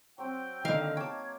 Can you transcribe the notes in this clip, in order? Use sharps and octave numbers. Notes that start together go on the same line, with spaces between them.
F#3 C4 G5
D3 D#3 A#3 D#4 F5
C#5 G5 A5 D6 G#6